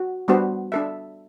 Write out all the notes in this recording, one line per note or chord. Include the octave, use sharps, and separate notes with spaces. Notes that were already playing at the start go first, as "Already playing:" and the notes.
Already playing: F#4
G3 B3 D4 F#4 C5
D4 A4 E5